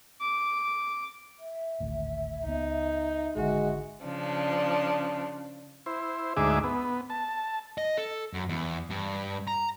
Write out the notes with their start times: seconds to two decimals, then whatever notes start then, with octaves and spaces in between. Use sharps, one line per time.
0.21 D6
1.39 E5
1.80 G#1 D2 A2
2.45 C#2 B3 D#4
3.36 G#1 D3 G#3 F#4
4.03 C#3 F3 D4
5.86 E4 C5
6.37 D2 G#2 D#4 G#4 E5 D6
6.64 B3
7.10 A5
7.78 D#5
7.97 A4
8.33 F#2
8.49 E2
8.90 G2
9.48 A#5